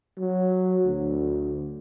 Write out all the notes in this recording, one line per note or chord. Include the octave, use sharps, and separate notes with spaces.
F#3
D2